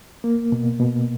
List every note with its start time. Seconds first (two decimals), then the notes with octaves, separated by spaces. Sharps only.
0.24 A#3
0.52 B2
0.80 B2